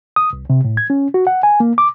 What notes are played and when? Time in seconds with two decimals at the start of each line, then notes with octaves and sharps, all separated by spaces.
0.16 D#6
0.33 C2
0.50 C3
0.65 A2
0.77 G#6
0.90 C#4
1.14 F#4
1.27 F#5
1.43 G#5
1.60 A#3
1.78 D6